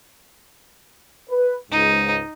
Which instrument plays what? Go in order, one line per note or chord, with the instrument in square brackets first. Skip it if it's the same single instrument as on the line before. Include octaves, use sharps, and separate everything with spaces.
[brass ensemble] B4
[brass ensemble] C#2 G#2 [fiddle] D#4